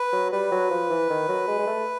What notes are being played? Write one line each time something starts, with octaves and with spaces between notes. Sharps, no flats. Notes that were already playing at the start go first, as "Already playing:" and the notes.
Already playing: B4
F#3
G3 B4
F#3
F3
E3
D#3
F#3
G#3
G#3
A3